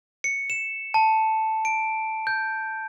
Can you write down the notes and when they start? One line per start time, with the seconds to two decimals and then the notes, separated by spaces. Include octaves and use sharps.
0.24 C#7
0.50 E7
0.94 A5
1.65 D7
2.27 G6